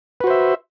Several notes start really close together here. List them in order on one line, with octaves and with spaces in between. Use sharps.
B4 F#4 C5 E5